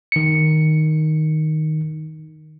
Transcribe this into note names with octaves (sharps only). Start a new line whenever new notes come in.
D#3 C#7